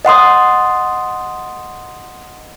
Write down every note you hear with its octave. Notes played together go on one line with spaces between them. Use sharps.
D#5 F#5 C6 D#6